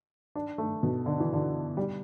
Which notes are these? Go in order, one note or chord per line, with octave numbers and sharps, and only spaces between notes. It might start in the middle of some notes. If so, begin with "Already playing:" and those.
D4
A3
B2
D3
E3
D3
G3